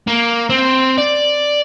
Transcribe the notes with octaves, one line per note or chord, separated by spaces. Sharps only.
A#3
C4
D5